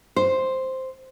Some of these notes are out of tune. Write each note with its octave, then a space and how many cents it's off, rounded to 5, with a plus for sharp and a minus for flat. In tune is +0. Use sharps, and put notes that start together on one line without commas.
C5 +0